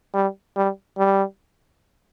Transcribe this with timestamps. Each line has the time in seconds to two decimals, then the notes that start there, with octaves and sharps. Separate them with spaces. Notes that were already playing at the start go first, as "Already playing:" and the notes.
0.14 G3
0.56 G3
0.98 G3